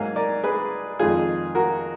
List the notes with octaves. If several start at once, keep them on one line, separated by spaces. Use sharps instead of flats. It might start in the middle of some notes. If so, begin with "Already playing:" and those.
Already playing: G#2 F#3 A#3 F5 G#5
A#4 D5
G#4 B4
F2 D#3 G#3 F4 G#4
F#4 A#4